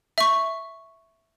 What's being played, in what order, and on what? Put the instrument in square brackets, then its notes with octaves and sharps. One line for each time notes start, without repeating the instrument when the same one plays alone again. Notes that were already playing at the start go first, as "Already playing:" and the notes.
[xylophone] E5 C#6